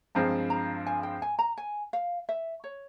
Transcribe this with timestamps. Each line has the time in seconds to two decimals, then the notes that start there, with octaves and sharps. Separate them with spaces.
0.15 G2 F3 G#3 C4 A#5
0.50 A#5
0.87 G#5
1.03 G5
1.22 G#5
1.39 A#5
1.58 G#5
1.93 F5
2.29 E5
2.64 C#5